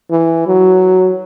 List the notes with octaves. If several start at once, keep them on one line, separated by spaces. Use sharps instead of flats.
E3
F#3